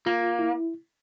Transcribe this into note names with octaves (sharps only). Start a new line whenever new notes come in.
A#3 F4
E4